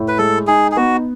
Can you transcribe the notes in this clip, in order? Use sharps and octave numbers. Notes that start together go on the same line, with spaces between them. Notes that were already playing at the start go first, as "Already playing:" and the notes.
Already playing: A2
B4
G#3 A4
D#4 G#4
G#4
B3 F#4